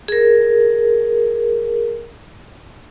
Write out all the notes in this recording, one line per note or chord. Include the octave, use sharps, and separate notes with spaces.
G#4 A#4